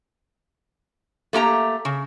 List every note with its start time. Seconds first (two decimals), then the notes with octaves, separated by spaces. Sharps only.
1.33 A3 A#3 G4 A#5
1.85 C#3